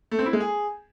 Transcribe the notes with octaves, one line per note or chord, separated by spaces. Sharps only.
A3
C4
E4
G#3
G#4